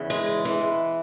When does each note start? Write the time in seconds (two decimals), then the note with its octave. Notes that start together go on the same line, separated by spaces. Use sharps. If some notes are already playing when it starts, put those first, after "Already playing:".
Already playing: E2 C#3 E3
0.10 G#3
0.45 E3